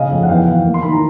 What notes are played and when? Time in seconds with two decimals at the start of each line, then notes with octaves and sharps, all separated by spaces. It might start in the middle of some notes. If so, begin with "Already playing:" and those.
Already playing: C#3 D#5 F5
0.11 F2
0.23 F#5
0.29 E2 F5 G5
0.47 E2
0.65 A#3
0.74 C6
0.83 D#3 B5
0.92 A#5